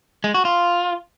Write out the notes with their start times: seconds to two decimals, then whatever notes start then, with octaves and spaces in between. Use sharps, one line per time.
0.24 G#3
0.34 F#4
0.45 F4